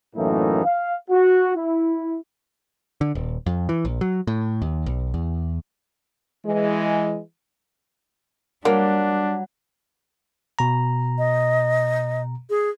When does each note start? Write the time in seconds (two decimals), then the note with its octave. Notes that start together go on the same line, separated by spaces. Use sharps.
0.16 F#2 A2 E3 A3 A#3 D#4
0.64 F5
1.10 F#4
1.55 E4
3.01 D3
3.15 D#1
3.46 F2
3.69 E3
3.85 A#1
4.01 F#3
4.27 A2
4.62 D#2
4.86 B1
5.14 E2
6.46 E3 G#3
8.65 F#3 G3 A#3 D4
10.59 B2 A#5
11.18 D#5
12.50 G#4